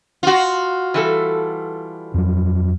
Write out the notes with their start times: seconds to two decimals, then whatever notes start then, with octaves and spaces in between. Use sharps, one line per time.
0.23 F4 F#4
0.94 E3 G3 A4
2.14 F2 F#3